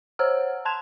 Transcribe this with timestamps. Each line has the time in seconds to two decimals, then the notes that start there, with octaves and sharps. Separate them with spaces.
0.19 C5 C#5 F#5 A#5 E6 F6
0.65 A5 C6 F#6 G#6 E7 F7